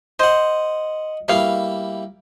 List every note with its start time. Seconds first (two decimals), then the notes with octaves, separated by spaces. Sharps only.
0.19 C5 D#5 F#5
1.28 B2 G3 A#3 E4 F5